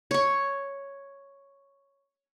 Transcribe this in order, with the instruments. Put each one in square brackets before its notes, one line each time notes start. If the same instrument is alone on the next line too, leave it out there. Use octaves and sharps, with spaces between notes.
[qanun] C#5 C#6